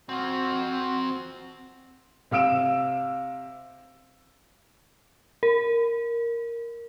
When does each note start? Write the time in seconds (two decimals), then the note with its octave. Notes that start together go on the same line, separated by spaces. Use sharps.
0.09 F3 C4 F#4
2.31 C3 F5 E6 D7 E7
5.43 A#4